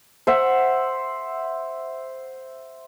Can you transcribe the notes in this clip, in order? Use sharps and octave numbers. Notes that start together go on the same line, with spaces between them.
C5 E5 F#5